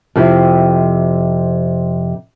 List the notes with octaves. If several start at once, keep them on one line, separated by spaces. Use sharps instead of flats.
F2 C3 C4 E4